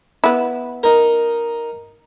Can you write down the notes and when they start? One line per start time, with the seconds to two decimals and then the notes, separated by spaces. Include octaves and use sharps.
0.24 B3 E4
0.83 D#4 A#4